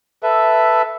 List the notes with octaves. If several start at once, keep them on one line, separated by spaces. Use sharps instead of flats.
A4 B4 E5